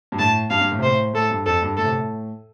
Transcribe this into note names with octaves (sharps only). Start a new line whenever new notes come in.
G2
A2 A5
G2 F5
G2
A2
C3
A2 C5
A2 A4
G2
F2 A4
G2
A2 A4
C3
A2